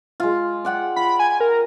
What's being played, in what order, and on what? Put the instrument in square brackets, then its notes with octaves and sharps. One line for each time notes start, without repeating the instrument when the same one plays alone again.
[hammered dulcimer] G#3 F4
D5 F#5 G5
[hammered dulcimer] F4 [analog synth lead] B5
[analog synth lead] G#5
A#4